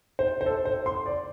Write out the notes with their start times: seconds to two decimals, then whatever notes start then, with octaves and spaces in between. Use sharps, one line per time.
0.19 C5
0.41 C5
0.46 A4
0.65 C5
0.86 C6
1.06 D5